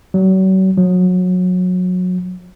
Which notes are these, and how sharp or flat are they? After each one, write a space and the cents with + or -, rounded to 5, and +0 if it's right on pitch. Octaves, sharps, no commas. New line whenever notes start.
F#3 +40
F#3 -25